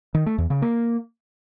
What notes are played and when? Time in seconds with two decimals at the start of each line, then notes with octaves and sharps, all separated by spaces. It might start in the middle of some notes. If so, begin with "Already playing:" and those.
0.14 D#3
0.26 A3
0.38 E2
0.50 C#3
0.62 A#3